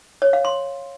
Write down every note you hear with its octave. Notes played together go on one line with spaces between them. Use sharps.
C#5
F5
C6